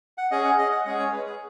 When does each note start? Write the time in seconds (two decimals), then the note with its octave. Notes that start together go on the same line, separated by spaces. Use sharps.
0.18 F#5
0.31 C#4 G#4 D#5
0.44 F#5
0.58 D#5
0.71 F#5
0.85 G#3 C#4 G#4 F#5
0.99 C#5
1.12 B4
1.26 G#4